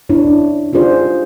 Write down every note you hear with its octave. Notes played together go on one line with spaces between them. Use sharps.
D4 E4 C#5
D#4 F4 G4 G#4 C5 D5